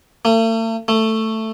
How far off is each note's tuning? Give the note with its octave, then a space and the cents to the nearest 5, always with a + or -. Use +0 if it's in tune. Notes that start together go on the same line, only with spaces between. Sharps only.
A3 +45
A3 +10